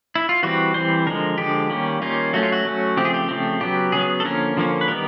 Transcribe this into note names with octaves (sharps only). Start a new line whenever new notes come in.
E4
F4
E3 G3 C4 F#4
E3 G3 C4 C5
D3 F3 G#3 A#4
D3 F3 G#3 G4
D#3 G3 A#3 C#4
D#3 G3 A#3 C#4 F4
F#3 A3 C#4 F#4
F4
F#4
F#3 A3 C#4
C#3 F3 A3 C4 G4
G#4
G4
C#3 F3 A3 C4
C#3 F#3 B3 G4
C#3 F#3 B3 G#4
A4
D3 F3 A#3 C#4 A#4
D3 F3 A#3 C#4
B4
D#3 G3 B3 A#4